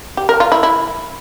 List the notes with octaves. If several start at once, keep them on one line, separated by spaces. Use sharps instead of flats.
G4
A#4
F4
E4
E4